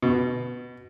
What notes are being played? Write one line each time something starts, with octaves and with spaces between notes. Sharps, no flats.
B2